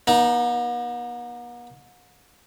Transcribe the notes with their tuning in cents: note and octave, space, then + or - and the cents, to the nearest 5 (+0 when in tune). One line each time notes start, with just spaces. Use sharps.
B3 -45 D#4 +0